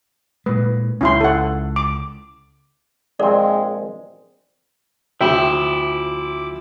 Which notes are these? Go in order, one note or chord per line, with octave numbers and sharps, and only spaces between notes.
A#2 G#3 B4
C#2 C#4 E4 C6
A4 F#5
D6
A#1 G#3 C4 D5
D2 F3 E4 E5 G5 D6